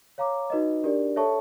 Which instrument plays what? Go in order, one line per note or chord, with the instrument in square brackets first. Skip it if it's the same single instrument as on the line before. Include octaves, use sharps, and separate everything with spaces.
[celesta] C#5 F5 A#5 D6
D#4 F#4 B4 D#5
D4 G4 A#4 D5
A4 C#5 E5 A5 C#6